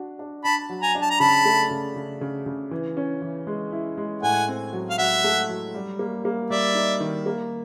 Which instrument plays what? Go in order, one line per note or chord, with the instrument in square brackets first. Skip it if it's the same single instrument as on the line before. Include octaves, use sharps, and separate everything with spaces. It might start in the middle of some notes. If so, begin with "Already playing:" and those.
Already playing: [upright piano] D4 F#4
D4
[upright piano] D4 [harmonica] A5 B5
[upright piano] F#3
[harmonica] G#5 A#5
[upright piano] D4
[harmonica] A5
A#5
[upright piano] C#3 [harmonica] A5 B5
[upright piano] A3
C#3
C#3
C#3
C#3
E3
C#4
E3
G#3
E4
G#3
[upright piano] A2 [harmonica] F#5 G#5
[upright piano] C4
F#3
[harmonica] F5
[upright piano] F#3 [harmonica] E5 F#5
[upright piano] A3
F#3
G3
A#3
A#3
[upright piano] G3 [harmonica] D5 E5
[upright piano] D#4
D#3
A#3